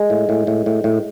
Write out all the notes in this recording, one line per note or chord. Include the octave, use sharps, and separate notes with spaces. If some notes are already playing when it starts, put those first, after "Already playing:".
Already playing: G#3
A2
A2
A2
A2
A2